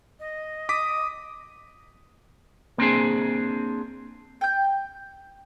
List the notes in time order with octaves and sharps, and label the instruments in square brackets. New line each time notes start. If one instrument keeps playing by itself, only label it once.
[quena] D#5
[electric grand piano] D6 B6 [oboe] D#6
[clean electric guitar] A#3 C4 D4 G#4
[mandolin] G5 G6